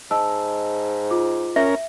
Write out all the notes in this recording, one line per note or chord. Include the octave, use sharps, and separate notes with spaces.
G#2 D#5 A5 E6
F4 D6
C#4 A#4 E5